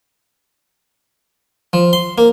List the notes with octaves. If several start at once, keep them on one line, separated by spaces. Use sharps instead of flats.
F3
C6
A#3